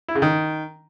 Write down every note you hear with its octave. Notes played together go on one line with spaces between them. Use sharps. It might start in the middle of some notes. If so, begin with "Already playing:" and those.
E4
C#3
D#3